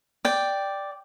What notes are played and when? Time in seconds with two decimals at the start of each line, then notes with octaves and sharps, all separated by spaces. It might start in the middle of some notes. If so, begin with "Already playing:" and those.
0.25 D5 G5